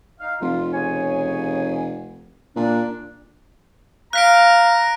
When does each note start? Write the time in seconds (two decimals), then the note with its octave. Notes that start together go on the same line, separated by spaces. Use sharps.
0.20 D#4 F5
0.41 F1 F4
0.73 C#3 C#5 G#5
2.56 A#2 D4
4.13 F5 A#5 F#6 B6 D7